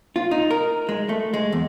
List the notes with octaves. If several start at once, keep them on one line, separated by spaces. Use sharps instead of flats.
F4
D#4
A#4
G#3
A3
G#3
E2